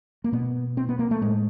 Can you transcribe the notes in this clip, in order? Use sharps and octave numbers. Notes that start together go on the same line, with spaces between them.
A#3
B2 B3
C4
B3
A#3
A3
A2 G#3